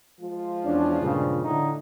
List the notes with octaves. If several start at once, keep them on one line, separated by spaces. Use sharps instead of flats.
F3 G#3 F4
E2 C#4 D4
G2 A#2 C#3
A2 D3 D#4